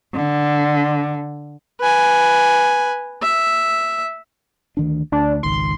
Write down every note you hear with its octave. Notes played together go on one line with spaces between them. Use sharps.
D3
B4 G#5
E5
D2 D#3 D4
D2 D4
G#1 C#2 D#3 C6